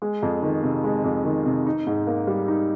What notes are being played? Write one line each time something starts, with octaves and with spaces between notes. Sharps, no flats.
G#3
F2
D#3
C3
G#3
F2
D#3
C3
D#4
G#2
A#3
G3
D#4